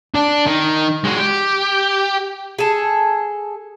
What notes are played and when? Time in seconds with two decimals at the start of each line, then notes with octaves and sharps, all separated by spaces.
0.15 D4
0.46 D#3
1.04 G#3 F#4
1.18 G4
2.59 G#4 A4